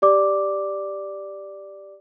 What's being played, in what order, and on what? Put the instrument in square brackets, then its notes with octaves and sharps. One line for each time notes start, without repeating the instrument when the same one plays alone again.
[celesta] G4 D5 D6